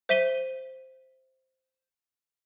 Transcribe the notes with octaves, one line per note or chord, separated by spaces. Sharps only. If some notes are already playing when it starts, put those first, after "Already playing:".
C5 E5 B6 D#7 G7